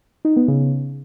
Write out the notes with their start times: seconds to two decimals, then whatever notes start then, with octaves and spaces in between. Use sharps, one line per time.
0.25 D#4
0.36 B3
0.48 C#3